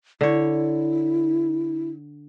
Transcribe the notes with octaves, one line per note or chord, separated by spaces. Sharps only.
D3 E4 C#5